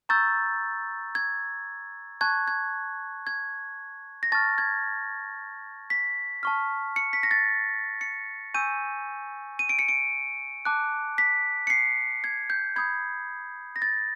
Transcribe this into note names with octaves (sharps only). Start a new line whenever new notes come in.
A#5 C#6 E6 G6 A6
G#6
A5 C#6 F#6 G#6
G#6
G#6
A#6
A5 C#6 F6 A6
G#6
B6
A5 C#6 F6
C#7
B6
A#6
A6
C#7
G#5 C#6 E6 G6 D#7
D#7
D7
C#7
D7
A5 D6 F#6
B6
C#7
C7
G#6
G6
B5 D#6 G6 G#6
A#6
A6